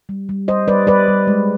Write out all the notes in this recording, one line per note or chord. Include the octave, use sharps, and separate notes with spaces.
G3
G3
G3 C5 D#5
G3 B4 D5
G3 B4 D5
G3
G#3